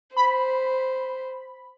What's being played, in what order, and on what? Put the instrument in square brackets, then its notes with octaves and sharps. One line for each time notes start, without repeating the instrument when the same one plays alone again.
[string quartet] C5 [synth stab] B5